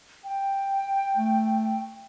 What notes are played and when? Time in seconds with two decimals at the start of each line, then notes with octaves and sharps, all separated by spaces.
0.24 G5
1.16 A3